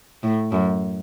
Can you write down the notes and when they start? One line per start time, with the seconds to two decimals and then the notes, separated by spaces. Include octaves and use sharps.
0.23 A2
0.52 F#2